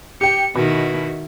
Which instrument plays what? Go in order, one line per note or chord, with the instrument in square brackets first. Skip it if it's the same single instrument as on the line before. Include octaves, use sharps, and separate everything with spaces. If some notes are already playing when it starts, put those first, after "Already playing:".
[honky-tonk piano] G4 G5 [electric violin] C#7
[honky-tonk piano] B2 [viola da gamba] D#3 E4 [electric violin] F#4